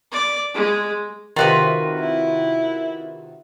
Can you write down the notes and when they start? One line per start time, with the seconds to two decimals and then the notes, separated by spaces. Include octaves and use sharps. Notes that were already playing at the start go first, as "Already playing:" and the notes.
0.12 D5
0.54 G#3
1.36 C3 D#3 F4 F#4 B4
1.99 E4